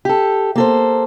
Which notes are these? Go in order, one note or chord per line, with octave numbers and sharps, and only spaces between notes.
G4 A4
A#3 A4 C5